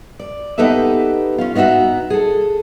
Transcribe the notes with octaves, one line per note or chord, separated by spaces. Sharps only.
D5
B3 D#4 G4 A4 B4 E5
C#4 F4
B3 D#4 E4 F#4 E5
G#4 A4